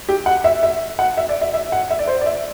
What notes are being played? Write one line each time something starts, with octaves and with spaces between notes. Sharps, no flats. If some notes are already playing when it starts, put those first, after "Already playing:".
G4
F#5
E5
E5
F#5
E5
D5
E5
E5
F#5
E5
D5
C5
D5
E5